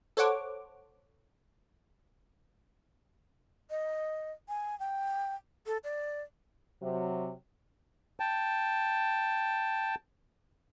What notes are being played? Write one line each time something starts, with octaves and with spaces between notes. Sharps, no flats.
A4 C5 C#5 F#5 D6
D#5
G#5
G5
A4
D5
C3 F#3
G5 A5